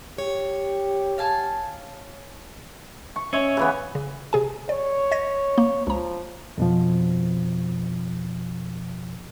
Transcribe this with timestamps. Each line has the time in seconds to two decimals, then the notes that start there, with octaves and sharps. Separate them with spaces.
0.18 G4 C#5
1.18 F5 G#5 A5
3.16 C#6
3.33 C#4 C#5 D#5 E5
3.57 C#3 E3 B3
3.95 C#3
4.33 C3 G#4 G#5
4.69 C#5 D5
5.12 D#5 G#6 A#6
5.58 A#3
5.87 C#2 F3 A#5
6.58 F2 B2 F3